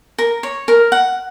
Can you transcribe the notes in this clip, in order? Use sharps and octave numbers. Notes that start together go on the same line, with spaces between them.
A#4
C#5
A#4
F#5